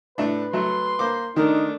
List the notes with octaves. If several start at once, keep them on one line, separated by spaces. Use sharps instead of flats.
A2 A3 D4 B4
F#3 A3 C6
A#3 C5 D6
D#3 A3 D4 D#4 A#4